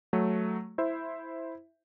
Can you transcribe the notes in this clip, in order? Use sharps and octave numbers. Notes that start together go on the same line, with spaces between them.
F#3 A3
E4 C5 E5